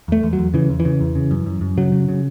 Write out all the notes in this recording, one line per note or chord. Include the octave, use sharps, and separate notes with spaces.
E2 A3
E2
F#3
E2
C#3 E3
E2
E3
C#3
E2
C#3
F#2
F#2
F#2
C#3 F#3
C#3
C#3